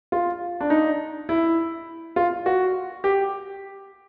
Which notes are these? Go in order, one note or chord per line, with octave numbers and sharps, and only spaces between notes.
F4
D4
D#4
E4
F4
F#4
G4